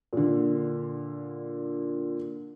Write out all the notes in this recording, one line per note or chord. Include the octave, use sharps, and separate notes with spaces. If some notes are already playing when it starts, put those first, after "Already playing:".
A#2 D3